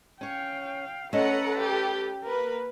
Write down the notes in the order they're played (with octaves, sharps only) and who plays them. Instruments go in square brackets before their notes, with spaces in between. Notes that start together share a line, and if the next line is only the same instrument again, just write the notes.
[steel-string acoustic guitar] C#4 C#5 [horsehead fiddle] F5 G5
[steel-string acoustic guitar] A3 D#5 [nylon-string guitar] C#4 [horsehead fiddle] A4 B4 [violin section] F#5 A#5
[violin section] G4
[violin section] A#3 B4 [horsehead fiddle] A#4